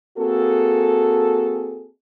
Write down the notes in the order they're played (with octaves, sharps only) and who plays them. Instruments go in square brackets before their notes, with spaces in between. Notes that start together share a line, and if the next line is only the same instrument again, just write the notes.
[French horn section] A#3 C4 F#4 G#4 A4